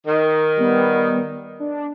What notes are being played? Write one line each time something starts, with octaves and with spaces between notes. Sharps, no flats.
D#3
G3 B3
D4